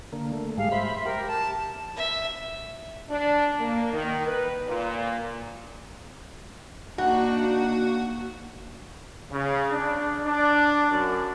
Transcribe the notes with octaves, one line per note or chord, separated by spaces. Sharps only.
D3 A#3
A3
G#2 G3 G#3 F5
C5 E5 B5
G4 A#4
A5
E5
D4
A#3
D#3
B4
A#2
A#3 D4 D#4 F#4 F#5
C#3
D4
D4
F#2